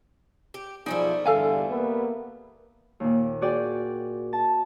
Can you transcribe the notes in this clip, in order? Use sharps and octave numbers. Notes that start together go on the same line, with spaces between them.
G4
B1 F3 G3 A3 D#4 E4 G#4
E2 G2 D3 A4 F5 G#5
A#3 B3
D#2 A#2
F#4 G#4 D5 G5
A5